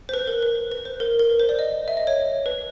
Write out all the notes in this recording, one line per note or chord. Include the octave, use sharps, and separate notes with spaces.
C5
B4
A#4
B4
B4
C5
A#4
A#4
B4
C5
D5
D#5
E5
D#5
C#5
B4